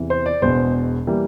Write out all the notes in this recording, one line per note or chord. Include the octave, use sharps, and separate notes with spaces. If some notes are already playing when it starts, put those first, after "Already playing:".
Already playing: E2 C3 E3
C5
D5
E1 E2 B2 C5
E3 G3 A#3